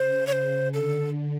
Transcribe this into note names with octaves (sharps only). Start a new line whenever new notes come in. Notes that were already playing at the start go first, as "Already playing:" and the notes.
Already playing: C#3 C5
C#5
C5
D3 A4